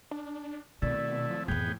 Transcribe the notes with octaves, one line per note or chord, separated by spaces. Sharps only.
D4
B2 D#3 A3 C4 E4 D5
F3
F2 A2 E3 B3 G#4 G5